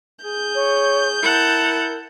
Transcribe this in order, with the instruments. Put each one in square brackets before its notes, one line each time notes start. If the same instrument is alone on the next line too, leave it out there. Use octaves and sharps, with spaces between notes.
[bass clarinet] G#4 [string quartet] G6
[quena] C#5
[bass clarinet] E4 [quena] A#4 [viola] F#5 A5